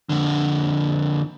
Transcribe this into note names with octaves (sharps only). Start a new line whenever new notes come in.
F2 D3